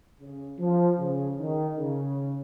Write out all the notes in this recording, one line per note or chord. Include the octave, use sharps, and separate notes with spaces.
C#3
F3
C#3
D#3
C#3